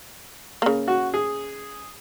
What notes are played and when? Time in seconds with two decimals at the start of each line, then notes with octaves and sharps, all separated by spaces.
0.62 C#3 A#3
0.88 F#4
1.14 G#4